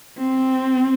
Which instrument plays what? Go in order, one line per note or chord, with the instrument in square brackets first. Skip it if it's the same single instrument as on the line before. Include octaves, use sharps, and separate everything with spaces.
[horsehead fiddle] C4